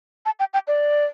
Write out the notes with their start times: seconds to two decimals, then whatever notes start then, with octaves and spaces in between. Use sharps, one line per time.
0.26 A5
0.40 G5
0.54 G5
0.68 D5